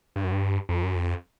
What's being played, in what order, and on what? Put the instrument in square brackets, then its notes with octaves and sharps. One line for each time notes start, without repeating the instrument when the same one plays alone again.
[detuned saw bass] G2
F#2
G2
F2
F#2
F2